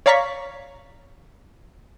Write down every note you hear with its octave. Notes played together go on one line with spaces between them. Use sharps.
C#5 D5 F5 A#5 C#6 B6